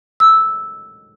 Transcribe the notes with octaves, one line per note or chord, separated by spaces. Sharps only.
E6